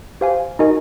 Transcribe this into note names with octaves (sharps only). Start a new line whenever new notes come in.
G4 C5 F5 G#5
D#4 F#4 A#4 D#5 G#5